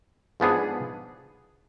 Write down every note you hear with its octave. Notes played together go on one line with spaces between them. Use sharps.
G#2 F3 B3 D4 G#4